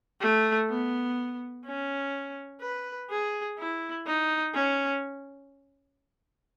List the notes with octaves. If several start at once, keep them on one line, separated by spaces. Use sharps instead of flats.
A3
B3
C#4
B4
G#4
E4
D#4
C#4